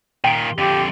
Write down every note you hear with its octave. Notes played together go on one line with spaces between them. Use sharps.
A#2 D#3 G5 D7
F2 D3 G4